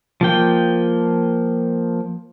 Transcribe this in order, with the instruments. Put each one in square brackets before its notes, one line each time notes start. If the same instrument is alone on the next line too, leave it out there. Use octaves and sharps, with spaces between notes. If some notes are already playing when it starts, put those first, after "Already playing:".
[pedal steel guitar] F3 A#3 G5